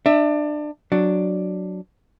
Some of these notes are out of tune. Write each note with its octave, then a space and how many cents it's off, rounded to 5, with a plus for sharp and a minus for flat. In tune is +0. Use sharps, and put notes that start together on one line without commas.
D4 +25 E5 +0
F#3 +0 D4 +5